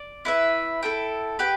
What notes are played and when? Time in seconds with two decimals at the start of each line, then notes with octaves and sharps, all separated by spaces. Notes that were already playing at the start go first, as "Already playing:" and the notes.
Already playing: D5
0.25 E4 B4 E5
0.83 E4 A4 G5
1.39 G4 B4 G5